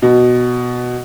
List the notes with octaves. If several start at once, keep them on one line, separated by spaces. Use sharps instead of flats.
B2